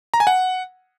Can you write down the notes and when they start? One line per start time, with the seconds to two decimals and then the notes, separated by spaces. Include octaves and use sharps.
0.14 A#5
0.20 G#5
0.27 F#5